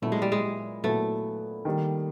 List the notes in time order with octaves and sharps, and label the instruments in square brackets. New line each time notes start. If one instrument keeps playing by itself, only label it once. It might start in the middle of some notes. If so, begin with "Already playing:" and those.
[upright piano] A#2 F#3 B3 E4 [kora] A3
[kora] G#3
G3
G#3
[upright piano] A#2 F#3 B3 E4 [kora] A3
[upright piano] D#3 G3 A#3